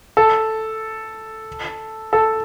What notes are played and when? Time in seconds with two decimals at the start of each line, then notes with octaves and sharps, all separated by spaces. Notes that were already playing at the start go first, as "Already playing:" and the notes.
0.17 A4
2.13 A4